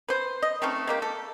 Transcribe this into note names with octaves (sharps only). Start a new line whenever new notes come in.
B4 C5
D#5
A3 C4 C#4 D#4
G#3 A#3 G4
A4